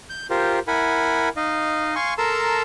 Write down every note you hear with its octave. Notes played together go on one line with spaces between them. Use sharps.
G6
F4 G4 A#4 C5
E4 A#4 F#5 G#5 B5
D#4 D#5 F5
F5 G#5 C6 C#6
A4 A#4 A5 A#5 C6 E6